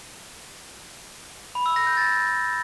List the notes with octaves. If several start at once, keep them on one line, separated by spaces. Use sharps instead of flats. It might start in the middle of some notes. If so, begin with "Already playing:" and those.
B5
E6
A#6
G6
A6